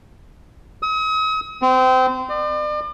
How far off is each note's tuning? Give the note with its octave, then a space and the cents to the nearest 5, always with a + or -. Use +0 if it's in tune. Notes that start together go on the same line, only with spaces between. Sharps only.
D#6 +40
C4 -25
D5 +40